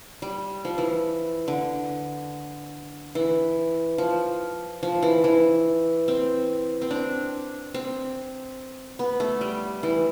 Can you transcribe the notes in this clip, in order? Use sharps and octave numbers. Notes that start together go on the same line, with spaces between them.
G3
F3
E3
D3
E3
F3
F3
E3
E3
C4
C4
D4
C4
B3
A3
G3
E3